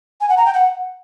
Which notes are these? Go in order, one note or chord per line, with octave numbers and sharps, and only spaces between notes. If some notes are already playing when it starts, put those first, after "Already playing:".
G#5
F#5
A#5
G5
F#5